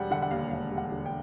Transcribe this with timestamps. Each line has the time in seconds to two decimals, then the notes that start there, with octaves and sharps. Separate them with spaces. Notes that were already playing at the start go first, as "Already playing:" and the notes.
Already playing: E1 G3 F#5
0.11 D3 F#5
0.22 F#5
0.31 D#2 F5
0.51 E1 F5
0.71 G3
0.78 F#5
0.92 D3
1.06 G5